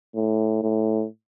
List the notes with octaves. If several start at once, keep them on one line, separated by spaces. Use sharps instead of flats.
A2
A2